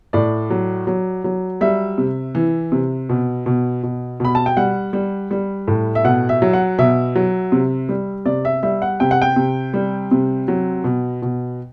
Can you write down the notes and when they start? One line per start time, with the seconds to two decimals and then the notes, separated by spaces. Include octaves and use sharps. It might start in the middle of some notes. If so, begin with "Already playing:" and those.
0.13 A2 D5
0.50 F#3
0.87 F#3
1.24 F#3
1.61 G3 E5
1.98 C3
2.35 E3
2.72 C3
3.09 B2
3.46 B2
3.83 B2
4.20 B2 B5
4.35 A5
4.46 G5
4.57 G3 F#5
4.93 G3
5.31 G3
5.68 A2
5.95 E5
6.04 B2 F#5
6.29 E5
6.42 F#3
6.53 F#5
6.78 B2 E5
7.15 F#3
7.52 C3
7.89 G3
8.26 C3 D5
8.45 E5
8.63 G3 E5
8.82 F#5
9.00 C3 G5
9.11 F#5
9.22 G5
9.36 C3
9.74 G3
10.11 C3
10.48 F#3
10.84 B2
11.22 B2